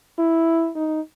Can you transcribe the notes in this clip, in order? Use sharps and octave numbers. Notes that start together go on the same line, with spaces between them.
E4
D#4